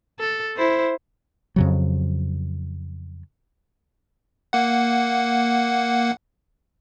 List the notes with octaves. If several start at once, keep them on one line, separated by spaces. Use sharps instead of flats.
A4
E4 C5
F2 C#3 F#3
A#3 F#5